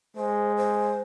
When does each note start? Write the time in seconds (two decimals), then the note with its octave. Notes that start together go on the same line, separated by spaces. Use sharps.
0.15 G#3 C5
0.57 C5